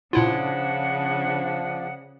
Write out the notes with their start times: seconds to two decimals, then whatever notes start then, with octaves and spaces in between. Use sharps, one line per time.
0.13 A#2 C#3 F3 D4 E4 F4 F#5